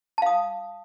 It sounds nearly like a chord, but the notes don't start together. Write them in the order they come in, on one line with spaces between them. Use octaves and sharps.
A5 F5 D#6